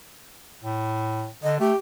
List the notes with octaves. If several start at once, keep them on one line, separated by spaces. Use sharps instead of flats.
A2
D3 D#5
A3 G4